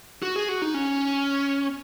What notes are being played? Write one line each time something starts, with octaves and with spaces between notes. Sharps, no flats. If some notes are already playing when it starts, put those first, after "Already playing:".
F#4
G#4
F#4
D#4
C#4